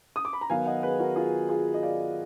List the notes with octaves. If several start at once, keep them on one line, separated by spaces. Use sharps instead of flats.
D#6
D6
B5
A#5
D#3 F#3 B3 F5 G#5
D#5 F#5
G#4 B4
F#4 A#4
F4 G#4
F4 G#4
D#5
D5 F5